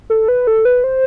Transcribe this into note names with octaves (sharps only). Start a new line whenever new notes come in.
A4
B4
A4
B4
C5